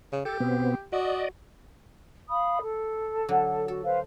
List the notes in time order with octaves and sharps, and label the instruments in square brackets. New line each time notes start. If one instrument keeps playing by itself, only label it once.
[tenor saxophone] C#3
[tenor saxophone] G4 [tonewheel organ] A4
[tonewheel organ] B2 B3 C4
[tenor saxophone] F#4 [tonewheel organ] D5 D#5
[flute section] F5 B5 D#6
A4
[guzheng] D3 F#3
[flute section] F#4 [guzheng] A4
[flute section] B4 C5 F5